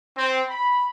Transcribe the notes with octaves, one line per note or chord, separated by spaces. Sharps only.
C4
B5